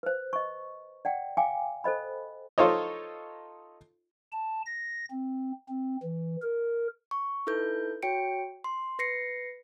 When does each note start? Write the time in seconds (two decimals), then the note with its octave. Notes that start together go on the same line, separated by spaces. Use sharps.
0.03 B4 C5
0.33 D#5 C#6
1.05 D5 F#5 G5
1.37 F5 G5 G#5 D6
1.84 A4 C5 D#5 B5
2.58 D#4 F4 A4 C5 C#5 D#5
4.32 A5
4.66 A#6
5.11 C4
5.69 C4
6.03 E3
6.42 A#4
7.11 C#6
7.47 D#4 E4 A4 B4 G6
8.03 F#4 C#5 G5 C#7 D7
8.64 C6
8.99 B4 A#6 C7 C#7